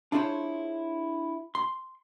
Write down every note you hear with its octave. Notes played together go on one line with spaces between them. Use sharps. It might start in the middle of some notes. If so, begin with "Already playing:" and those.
D4 E4 F4 G#4 C5 C#5
C6